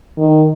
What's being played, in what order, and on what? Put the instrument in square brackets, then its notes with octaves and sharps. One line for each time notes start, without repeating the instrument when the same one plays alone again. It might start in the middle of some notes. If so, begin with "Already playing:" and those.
[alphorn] D#3